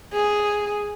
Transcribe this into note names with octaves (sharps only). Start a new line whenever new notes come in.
G#4